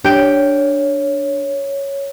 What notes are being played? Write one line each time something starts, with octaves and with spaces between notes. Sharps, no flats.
D4 G4 C#5 G5